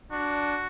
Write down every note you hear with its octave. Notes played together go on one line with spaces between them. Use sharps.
D4 F#4